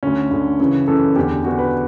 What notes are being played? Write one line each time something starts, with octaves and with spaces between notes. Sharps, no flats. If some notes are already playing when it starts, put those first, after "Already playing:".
D2 D3 C#4
D2 D3
F#2 C#3 E3
F#2 C#3 E3 A4
E2 D3 G4
E2 D3 F#4
B4